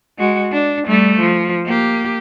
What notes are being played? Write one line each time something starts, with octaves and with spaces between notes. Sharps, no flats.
G#3 F#4
D4
G3 A3
F3
A#3 G4